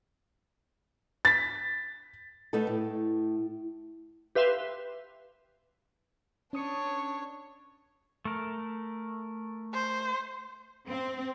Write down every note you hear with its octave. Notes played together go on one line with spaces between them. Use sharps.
A6 B6
A3 B3 D#4 A4
A2
G4 B4 E5 F5 C6
C#4 D4 C#5 D#6 C#7
A3 A#4
C5
C4